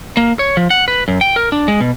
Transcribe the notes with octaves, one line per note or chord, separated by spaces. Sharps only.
A#3
C#5
F3
F#5
B4
F#2
G5
A#4
D4
G#3
B2